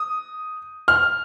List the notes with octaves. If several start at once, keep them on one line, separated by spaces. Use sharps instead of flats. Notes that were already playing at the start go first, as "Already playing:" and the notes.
Already playing: D#6
F6